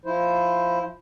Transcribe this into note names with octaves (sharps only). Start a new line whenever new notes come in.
F3 E4 C5